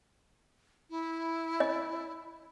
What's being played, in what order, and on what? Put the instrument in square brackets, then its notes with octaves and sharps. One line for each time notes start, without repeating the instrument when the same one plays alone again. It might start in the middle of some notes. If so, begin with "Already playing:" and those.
[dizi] E4
[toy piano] D#5